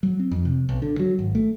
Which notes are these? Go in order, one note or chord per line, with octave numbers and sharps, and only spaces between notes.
F#3
C4
F2
C3
B1
D3
F#3
G#1
A3